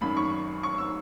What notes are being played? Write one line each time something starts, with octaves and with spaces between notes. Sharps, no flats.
G#1 F#2 D#3 B5
C#6
C#6
E6